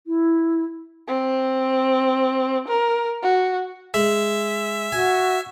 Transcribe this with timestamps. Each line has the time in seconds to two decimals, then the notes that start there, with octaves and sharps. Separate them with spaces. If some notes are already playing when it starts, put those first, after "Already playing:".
0.07 E4
1.07 C4
2.68 A#4
3.22 F#4
3.94 G#3 E5
4.92 F#4 G#5